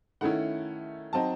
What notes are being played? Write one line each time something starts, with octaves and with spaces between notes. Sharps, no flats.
D#3 A3 C#4 E4 F#5
F#3 C4 D#4 A5